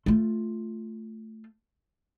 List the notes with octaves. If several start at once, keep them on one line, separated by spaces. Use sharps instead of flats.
A3 F4